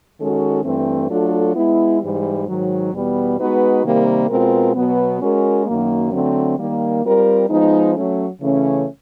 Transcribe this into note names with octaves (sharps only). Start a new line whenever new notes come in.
D#3 G#3 C#4 F#4 A4
G2 E3 A3 C4
F#3 A3 D4 F4 A4
G#3 B3 E4
G#2 E3 G3
G#2 D#3 F#3
E2 B2 G3 B3
G#3 B3 D#4 F#4 B4
C3 D#3 G3 A#3
B2 G#3 C4 F4 A#4
B2 F#3 B3
G#3 C#4 F#4 A#4
F#2 D#3 F#3 A#3
D3 F#3 A3 C4
D#3 G3 A#3
G3 C4 F4 A#4
F3 G#3 B3 D#4
F#3 A3 C#4
C#3 E3 A3 C#4